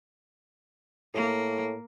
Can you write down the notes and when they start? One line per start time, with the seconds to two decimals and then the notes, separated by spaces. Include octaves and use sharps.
1.14 A2 A#3